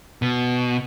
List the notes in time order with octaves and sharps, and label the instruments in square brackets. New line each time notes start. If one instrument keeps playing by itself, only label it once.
[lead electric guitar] B2